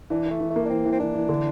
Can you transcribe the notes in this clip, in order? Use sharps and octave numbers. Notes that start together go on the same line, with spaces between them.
E3 D4
E3
A3
E3
A3
A#3
D4
E3 C4
E3
C4
E3 D4
E3
D3